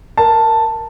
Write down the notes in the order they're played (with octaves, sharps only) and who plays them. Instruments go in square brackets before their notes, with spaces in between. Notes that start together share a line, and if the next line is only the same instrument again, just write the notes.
[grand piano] A#4 A5